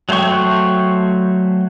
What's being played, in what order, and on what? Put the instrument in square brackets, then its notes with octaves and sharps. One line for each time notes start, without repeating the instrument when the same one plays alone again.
[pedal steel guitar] F#3 A3 C5 G5 C#6